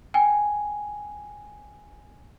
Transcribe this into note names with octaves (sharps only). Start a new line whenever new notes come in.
G5 G#5